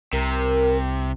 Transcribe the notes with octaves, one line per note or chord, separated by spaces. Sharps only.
C2 C3 A#4